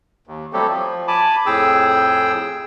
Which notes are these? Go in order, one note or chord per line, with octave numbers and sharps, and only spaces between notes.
D#2
F#3 G3 A3 C4 G4 A4
F3
G#5 A5 B5 D6
F2 A2 G#4 G5 E6